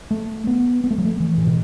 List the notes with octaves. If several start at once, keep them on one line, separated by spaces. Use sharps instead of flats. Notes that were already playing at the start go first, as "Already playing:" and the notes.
A3
B3
B3
A3
F#3
A3
E3
A2
B2